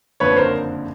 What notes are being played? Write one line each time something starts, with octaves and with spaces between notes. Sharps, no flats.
F#1 F2 D3 F3 B4 C#5
A#4 C5